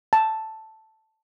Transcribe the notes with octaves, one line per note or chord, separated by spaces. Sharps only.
A5